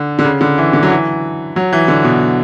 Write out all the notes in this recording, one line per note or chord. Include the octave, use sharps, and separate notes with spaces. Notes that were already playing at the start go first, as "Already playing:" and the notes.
Already playing: D3
D3
C#3
D3
E3
D3
F#3
E3
F#3
E3
D3
B2